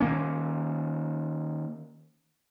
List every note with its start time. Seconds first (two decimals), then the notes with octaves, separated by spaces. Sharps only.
0.01 D#3 A#3 C#4